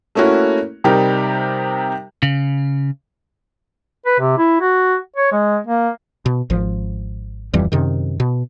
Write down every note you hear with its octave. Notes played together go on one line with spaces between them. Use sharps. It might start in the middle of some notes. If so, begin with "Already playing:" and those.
A3 A#3 C#4 E4 F#4
C3 G3 D#4 G4 A#4
C#3
B4
C3
E4
F#4
C#5
G#3
A#3
B2
G#1 F3
D1 F2 E3 G3
F#2 C3 D#3
B2